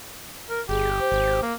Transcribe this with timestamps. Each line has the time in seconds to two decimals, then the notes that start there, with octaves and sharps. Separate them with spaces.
0.50 A#4
0.69 G1 G4 G#4
1.00 C5
1.12 G#1
1.42 A#3